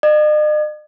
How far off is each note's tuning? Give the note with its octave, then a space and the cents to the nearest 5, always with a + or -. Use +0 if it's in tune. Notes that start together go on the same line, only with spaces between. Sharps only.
D#5 -45